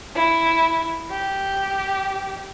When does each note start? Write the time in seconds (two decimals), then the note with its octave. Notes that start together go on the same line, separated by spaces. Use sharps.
0.15 E4
1.11 G4